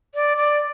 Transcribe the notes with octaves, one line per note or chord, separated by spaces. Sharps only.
D5
D5